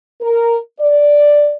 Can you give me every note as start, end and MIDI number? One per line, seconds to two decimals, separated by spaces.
0.21 0.58 70
0.80 1.57 74